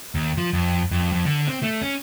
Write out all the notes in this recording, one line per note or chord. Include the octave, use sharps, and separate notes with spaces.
D#2
F3
F2
F2
F2
D3
C4
A3
C#4